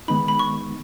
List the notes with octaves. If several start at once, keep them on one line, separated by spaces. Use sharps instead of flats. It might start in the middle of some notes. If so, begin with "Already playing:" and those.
D#3 G#3 B3 D#4 B5
B5
C#6